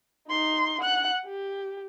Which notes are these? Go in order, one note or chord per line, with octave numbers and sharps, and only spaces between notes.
D#4 C6
F#5 F#6
G4